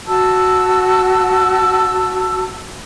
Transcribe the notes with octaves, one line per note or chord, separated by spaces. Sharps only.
F#4 A5 E6